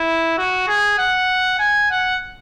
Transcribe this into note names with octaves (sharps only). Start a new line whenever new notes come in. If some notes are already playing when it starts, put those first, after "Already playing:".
Already playing: E4
F#4
G#4
F#5
G#5
F#5